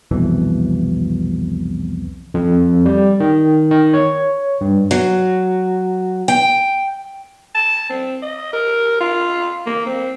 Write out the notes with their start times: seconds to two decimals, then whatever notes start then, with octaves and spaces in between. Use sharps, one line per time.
0.11 C2 F2 B2 E3
2.34 F2
2.86 G3
3.20 D#3
3.71 D#3
3.94 C#5
4.61 G2
4.91 F#3
6.28 G5
7.55 A5
7.90 C4
8.22 D#5
8.53 A#4
9.00 F4
9.66 A#3
9.86 C4